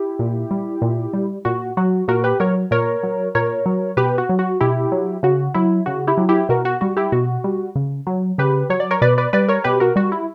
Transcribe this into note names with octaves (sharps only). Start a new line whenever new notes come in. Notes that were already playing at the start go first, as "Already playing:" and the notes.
Already playing: E4 G4
A#2
G3
A#2
G3
A#2 F#4
F#3 F#4
A#2 F#4 A#4
G4 B4
F#3 A#4 C#5
A#2 A#4 C#5
F#3
A#2 A#4 C#5
F#3
B2 G4 B4
F#4
F#3
F#4
B2 E4 G4
F#3
C#3 F#4
F#3 E4
C#3 F#4
E4 G4
F#3
E4 G4
B2 F#4 A#4
F#4
G3 F#4
E4 G4
B2 F#4
G3
C#3
F#3
C#3 G4 B4
F#3 C#5
D5
A#4 C#5
B2 B4 D5
B4 D5
G3 B4 D5
A#4 C#5
B2 G4 B4
F#4 A#4
G3 F#4
E4